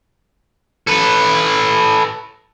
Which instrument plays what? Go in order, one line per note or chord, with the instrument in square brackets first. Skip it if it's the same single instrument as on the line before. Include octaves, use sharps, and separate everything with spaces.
[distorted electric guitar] A4 B4